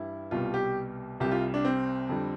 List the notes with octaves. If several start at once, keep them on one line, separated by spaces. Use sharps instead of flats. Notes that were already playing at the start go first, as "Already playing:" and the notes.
Already playing: G2 E3 G3 E4
C2 B2 G3 F4
G4
C2 C3 G3 G4
F4
D4
C4
F2 D3 G3